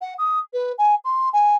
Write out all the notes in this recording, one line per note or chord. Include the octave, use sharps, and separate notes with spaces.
F#5
D#6
B4
G#5
C6
G#5